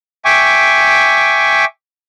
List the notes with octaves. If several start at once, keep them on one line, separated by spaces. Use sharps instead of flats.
E5 G5 G#5 C#6 D6